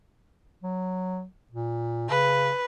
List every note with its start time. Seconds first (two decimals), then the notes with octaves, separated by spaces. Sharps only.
0.63 F#3
1.51 A#2
2.10 C#3 B4